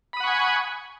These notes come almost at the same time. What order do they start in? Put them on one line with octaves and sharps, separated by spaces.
B5 D#6 F#5 C#6 G#5